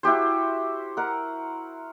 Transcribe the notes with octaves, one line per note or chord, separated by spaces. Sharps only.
E4 F#4 G4 C5
A#4 F#5